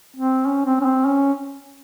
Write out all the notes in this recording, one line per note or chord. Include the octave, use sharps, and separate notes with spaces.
C4
C#4
C4
C#4
C4
C#4